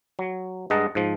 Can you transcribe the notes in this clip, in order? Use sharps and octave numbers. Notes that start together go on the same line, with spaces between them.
F#3
G2 G#3 D#5 F#5 A5 A#5
G#2 F3